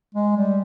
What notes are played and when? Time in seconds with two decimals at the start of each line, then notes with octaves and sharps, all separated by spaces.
0.15 G#3
0.36 G3